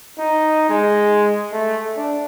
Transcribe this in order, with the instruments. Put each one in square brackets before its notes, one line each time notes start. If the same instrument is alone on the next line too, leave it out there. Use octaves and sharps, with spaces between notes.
[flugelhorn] D#4
G#3
A3
D4